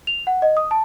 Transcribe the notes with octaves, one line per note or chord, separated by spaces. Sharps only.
F7
F#5
D#5
D#6
A5